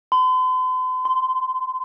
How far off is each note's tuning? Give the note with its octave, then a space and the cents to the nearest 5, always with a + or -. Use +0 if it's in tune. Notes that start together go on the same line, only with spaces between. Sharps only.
C6 -45
C6 -20